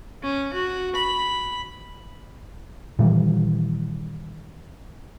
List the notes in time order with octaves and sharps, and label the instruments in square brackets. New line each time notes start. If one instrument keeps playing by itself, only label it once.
[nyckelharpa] C#4
F#4
B5
[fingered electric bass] A#2 D#3 E3 G3